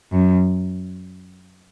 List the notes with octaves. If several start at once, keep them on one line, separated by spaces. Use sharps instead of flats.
F#2